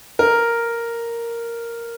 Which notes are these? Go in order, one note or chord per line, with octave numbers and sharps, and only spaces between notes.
A#4